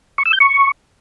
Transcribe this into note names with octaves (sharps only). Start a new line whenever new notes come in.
C#6
E6
G6
C#6